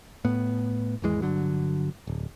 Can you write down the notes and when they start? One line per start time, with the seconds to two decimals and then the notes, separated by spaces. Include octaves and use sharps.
0.25 A2 B3
1.02 G#1 E2 E3 G#3
1.22 G1 D3 F#3
2.07 D1